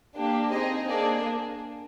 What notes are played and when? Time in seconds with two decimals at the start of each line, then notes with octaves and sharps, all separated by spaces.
0.16 A#3 D4 G4
0.52 C4 D#4 G#4 D#5
0.89 A#3 D4 G#4 D5